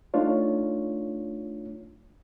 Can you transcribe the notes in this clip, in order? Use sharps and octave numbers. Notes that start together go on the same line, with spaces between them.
A3 D4 D#4 F4 C#5